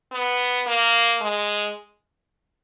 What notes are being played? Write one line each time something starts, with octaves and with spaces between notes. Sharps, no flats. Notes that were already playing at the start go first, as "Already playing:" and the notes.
B3
A#3
G#3